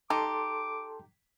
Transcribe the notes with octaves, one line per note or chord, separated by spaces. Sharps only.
D#4 G4 A4 A5 C6 D6